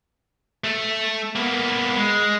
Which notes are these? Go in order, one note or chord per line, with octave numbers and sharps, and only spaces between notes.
A3
A#3 B3
G#3